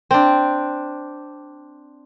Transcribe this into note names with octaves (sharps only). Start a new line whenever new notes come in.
C4 D4